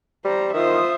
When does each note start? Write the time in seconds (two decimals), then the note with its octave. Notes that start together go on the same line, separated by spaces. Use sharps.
0.25 G3 C5 A#5
0.54 D#3 F4 C5 E5 D#6